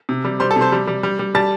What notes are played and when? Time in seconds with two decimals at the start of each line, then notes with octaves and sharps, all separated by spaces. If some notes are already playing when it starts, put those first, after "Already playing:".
0.09 C3
0.25 G3
0.40 G3 C5 C6
0.51 A4 A5
0.56 C3
0.61 C5 C6
0.72 G3
0.87 G3
1.03 G3
1.19 G3
1.35 G3 A5 A6